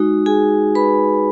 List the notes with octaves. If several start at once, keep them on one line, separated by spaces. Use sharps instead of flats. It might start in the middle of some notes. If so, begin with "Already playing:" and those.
Already playing: G#3 D#4 F#4
G#4 G#5
B4 B5